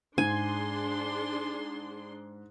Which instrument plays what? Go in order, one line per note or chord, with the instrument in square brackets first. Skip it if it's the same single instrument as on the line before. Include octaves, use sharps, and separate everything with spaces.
[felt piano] G#2 [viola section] D4 G#4 C6 [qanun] G#5